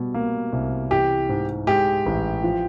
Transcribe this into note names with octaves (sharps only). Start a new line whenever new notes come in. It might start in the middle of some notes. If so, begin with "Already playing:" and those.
Already playing: B2 G3
A#3
C2
E3 G4
G#2
G#3 G4
A1
F3